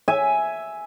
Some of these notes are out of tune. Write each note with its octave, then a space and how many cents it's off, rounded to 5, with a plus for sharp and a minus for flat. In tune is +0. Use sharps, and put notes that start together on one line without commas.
E5 +0 G#5 +5